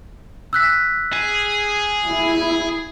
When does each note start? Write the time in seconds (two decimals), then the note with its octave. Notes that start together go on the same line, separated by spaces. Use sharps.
0.53 E6 F#6 B6
1.13 G#4
2.07 E4